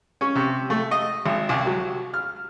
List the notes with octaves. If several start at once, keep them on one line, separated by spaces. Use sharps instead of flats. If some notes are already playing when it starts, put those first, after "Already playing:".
C#4
C3
A3
D#5
G#1
C2
F#3
F6